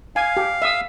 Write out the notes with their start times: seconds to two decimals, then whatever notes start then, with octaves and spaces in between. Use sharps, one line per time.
0.16 F5 G#5
0.37 G4
0.62 E5 D#6